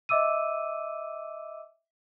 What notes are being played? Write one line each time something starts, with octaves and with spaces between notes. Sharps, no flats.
D#5 E5 D6 E6 D#7